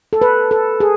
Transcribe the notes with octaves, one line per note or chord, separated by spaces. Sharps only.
A4
B4
A4
G#4